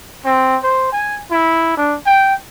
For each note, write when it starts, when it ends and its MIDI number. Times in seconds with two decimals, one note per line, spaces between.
0.25 0.57 60
0.63 0.92 72
0.92 1.20 80
1.31 1.72 64
1.77 1.96 62
2.06 2.35 79